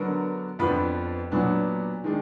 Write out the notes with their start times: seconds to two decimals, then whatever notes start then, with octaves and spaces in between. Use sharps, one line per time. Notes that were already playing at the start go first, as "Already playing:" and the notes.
Already playing: D3 F#3 B3 D4 A#4
0.59 F2 F3 B3 D4 B4
1.32 A#2 F#3 B3 D4
2.04 D#3 G#3 D4